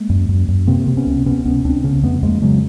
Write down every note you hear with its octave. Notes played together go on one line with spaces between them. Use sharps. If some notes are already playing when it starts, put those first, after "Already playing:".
Already playing: G#3 A#3
F#2
F#2
F#2
C3 A#3 C4
C3
B3 C#4
C#2
C3 B3 C#4
C#2 B3 C#4
C#2 C4 D4
C#3 B3 C#4
F2 A3 B3
F2 G#3 A#3
C#3 F#3 G#3